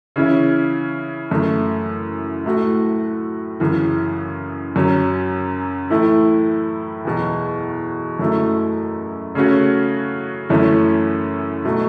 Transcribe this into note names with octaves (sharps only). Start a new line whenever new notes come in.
C#3 E3 C#4 E4
F#2 E3 A3 E4
A2 A3 F#4
F#2 C#3 E3
F#2 F#3 C#4
A2 E3 A3 E4
E2 B2 F#3
F#2 F#3 A3 E4
C#3 A3 C#4 F#4
F#2 E3 A3 C#4 E4
B2 F#3 A3